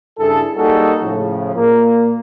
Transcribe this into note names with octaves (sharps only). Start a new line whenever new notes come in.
G2 C#3 E4 G#4 A4
G3 A#3 D#4 F#4 G#4 A4
A2 C#3 F3
A#2 A#3